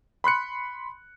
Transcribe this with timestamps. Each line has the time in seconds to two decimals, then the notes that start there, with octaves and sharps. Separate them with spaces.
0.24 B5 C6 F#6 C#7